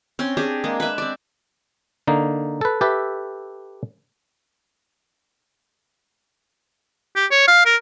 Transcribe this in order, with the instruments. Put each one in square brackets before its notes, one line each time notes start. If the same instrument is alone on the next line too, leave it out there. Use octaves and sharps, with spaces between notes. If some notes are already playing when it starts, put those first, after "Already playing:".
[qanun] C4 C#4 C6
D4 G4 G#4
G#3 A#3
B4 E5
C4 D5
[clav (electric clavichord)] D3 A#3 D#4
A4 B4
G4 A4 B4 E5
[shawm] G4
C#5
F5
A#4